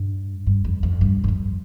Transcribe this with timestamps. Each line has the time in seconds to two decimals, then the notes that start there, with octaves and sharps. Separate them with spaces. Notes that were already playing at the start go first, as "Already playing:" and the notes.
Already playing: G2
0.47 G2
0.65 F2
0.83 F2
1.01 G2
1.24 G2
1.28 F2